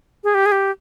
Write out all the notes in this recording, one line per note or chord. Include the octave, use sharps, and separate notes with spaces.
G#4
G4
G#4
G4